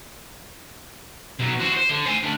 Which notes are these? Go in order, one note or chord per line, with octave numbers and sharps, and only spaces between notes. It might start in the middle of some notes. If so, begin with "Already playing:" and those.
B2 F#3
F#4 C5
C5
D3
C5 G#5
D2 D4